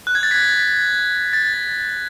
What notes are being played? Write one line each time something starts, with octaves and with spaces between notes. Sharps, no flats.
F#6
G#6
A6
B6
A6